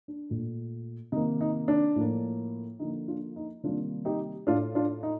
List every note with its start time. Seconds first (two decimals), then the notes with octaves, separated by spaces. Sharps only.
0.08 D4
0.30 A#2 A3
1.12 C3 D#3 A#3 D#4
1.41 D#4
1.68 D4
1.96 A2 F3 A#3
2.79 D3 F3 A#3 D#4
3.08 D4 F4
3.36 D#4
3.63 C3 D#3 G3 A#3 D4 F4
4.05 D#4 G4
4.47 A2 A3 D4 F4
4.75 D4 F4
5.03 D#4